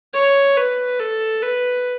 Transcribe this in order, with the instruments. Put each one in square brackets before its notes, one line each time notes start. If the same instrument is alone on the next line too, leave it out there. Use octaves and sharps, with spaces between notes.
[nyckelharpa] C#5
B4
A4
B4